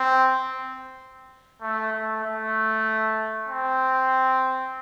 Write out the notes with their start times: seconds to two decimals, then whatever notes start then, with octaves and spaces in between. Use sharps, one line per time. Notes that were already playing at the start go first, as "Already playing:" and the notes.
Already playing: C4
1.62 A3
1.93 A3
2.24 A3
3.47 C4